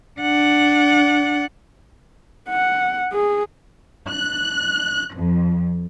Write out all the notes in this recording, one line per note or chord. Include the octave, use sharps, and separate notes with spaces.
D4 F#5
F#5
G#4
F#6
F2